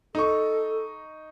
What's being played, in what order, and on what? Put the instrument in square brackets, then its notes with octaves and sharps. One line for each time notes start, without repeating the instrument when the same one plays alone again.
[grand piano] D#4 C#6 [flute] A4